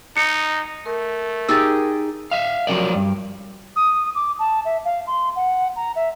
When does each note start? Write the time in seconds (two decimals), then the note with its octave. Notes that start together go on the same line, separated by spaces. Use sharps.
0.17 D#4 C#7
0.86 A3 A#4
1.49 D#4 G4 G#4 E6 A6
2.31 E5 F5
2.67 F3 F#3 C#4 A#4 D5
2.95 G2
3.76 D#6
4.15 D6
4.39 A5
4.65 E5
4.84 F5
5.07 C6
5.36 F#5
5.76 A#5
5.96 E5